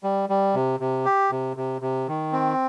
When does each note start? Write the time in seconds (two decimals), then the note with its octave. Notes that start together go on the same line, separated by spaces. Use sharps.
0.03 G3
0.29 G3
0.54 C3
0.80 C3
1.05 G4
1.31 C3
1.57 C3
1.81 C3
2.08 D#3
2.32 C4